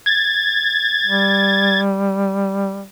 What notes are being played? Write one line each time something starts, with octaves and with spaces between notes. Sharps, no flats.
G#6 A6
G3